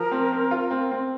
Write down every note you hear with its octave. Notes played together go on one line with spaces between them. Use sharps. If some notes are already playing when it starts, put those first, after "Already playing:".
Already playing: F3 A#4
C4
C4
F4
C4
C4